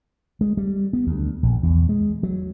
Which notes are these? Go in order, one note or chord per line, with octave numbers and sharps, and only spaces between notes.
G#3
G3
B3
D2
A#1
E2
G#3
F#3